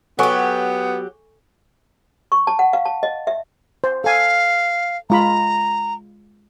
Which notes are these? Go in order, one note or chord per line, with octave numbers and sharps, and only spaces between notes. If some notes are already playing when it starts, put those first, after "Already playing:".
F#3 B3 G4 A4 G#5 C#6
C#6
A5
F#5
F5
A5
D#5
E5
C5
A4 F5 G#5
G#3 F4 A#5 B5